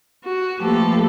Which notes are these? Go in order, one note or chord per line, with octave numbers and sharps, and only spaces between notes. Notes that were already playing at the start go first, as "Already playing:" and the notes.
F#4
F3 A3 A#3 G4 A4 B4